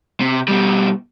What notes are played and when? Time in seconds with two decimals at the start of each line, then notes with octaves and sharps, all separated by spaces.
0.20 C3
0.48 B2 G3